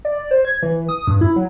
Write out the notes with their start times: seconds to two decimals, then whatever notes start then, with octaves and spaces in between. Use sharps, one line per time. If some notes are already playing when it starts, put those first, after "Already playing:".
0.05 D5
0.31 C5
0.45 G#6
0.63 E3
0.89 D#6
1.07 G2
1.21 E4
1.36 F#3